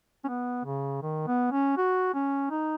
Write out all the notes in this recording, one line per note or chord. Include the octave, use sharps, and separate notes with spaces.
C#4
B3
C#3
D#3
B3
C#4
F#4
C#4
D#4